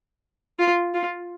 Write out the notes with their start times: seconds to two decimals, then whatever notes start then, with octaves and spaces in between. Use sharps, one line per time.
0.59 F4
0.94 F4